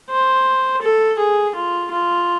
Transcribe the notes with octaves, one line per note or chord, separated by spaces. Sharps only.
C5
A4
G#4
F4
F4